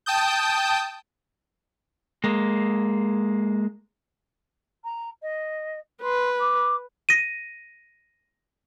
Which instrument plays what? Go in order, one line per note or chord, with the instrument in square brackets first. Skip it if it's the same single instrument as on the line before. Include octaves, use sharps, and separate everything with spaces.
[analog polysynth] G5 A5 D#6 G6
[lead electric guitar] G#3 A#3
[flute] A#5
D#5
[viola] B4 [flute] C6
[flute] D6
[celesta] A#6 D#7